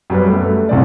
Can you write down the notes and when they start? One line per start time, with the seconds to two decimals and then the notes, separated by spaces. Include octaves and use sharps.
0.10 F#2 G3 B4
0.27 A3
0.69 C2 C#3 C4 D5